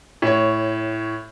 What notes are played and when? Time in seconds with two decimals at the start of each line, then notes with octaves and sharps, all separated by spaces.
0.22 A2 C#5